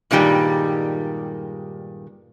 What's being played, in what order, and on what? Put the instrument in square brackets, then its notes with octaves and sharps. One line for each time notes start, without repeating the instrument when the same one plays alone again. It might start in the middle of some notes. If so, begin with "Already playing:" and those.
[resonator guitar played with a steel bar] G2 A#2 D#3 G3 G#3